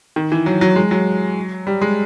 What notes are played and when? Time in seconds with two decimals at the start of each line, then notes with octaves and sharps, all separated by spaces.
0.16 D#3
0.32 E3
0.46 F#3
0.61 F#3
0.76 G#3
0.91 F#3
1.67 G3
1.82 G#3